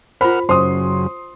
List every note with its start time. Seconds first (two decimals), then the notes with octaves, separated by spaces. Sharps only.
0.21 F4 A#4 C5 F#5 B5 F6
0.49 F#2 C#3 F#3 C5 C6 D#6